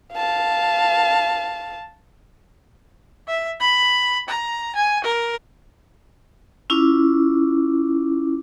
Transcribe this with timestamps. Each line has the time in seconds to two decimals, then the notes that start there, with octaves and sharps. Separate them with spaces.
0.13 F5 A5
3.27 E5
3.60 B5
4.28 A#5
4.75 G#5
5.04 A#4
6.70 C#4 E4 F4 D6